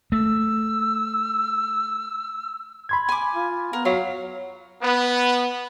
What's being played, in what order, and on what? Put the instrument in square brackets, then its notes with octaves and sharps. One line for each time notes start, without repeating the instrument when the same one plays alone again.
[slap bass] A3 [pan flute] E6
[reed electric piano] B5 C6 G#6
[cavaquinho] G#5 D6
[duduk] F4
[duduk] B3 [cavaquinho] A#4
[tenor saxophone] F#3 [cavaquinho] F5
[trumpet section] B3